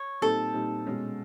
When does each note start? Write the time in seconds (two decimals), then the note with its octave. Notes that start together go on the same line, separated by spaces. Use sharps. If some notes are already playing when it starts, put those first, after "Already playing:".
Already playing: C#5
0.21 A#2 G3 C4 D#4 A4
0.54 A#2 G3 C4 D#4
0.86 B2 G#3 C#4